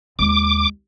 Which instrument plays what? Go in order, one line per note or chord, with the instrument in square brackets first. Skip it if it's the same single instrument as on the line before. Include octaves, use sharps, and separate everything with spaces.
[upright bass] D#2 G#3 [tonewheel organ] D6